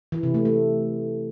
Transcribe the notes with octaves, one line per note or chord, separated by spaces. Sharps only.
E3
C3
A3
A3